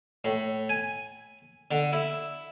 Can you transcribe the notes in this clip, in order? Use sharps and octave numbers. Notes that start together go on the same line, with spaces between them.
A2
G#5
D3
E4